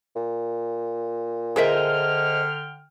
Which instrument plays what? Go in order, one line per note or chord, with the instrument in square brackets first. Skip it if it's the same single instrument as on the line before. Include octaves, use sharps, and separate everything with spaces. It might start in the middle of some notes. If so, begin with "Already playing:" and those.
[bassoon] A#2
[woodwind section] D3 G5 F6 [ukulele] G#4 A#4 E5 [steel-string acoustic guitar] C5 D#5